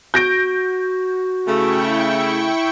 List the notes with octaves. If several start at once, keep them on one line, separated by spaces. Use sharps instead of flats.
F#4 G6 A#6 D7
C#3 A3 E4 G5 C#6